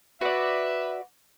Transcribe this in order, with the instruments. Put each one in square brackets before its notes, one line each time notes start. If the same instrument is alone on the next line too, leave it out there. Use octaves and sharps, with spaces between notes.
[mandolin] F#4 D5 [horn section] B4 E5